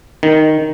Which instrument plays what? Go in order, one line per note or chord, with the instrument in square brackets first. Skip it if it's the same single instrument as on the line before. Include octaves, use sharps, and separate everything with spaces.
[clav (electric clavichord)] D#3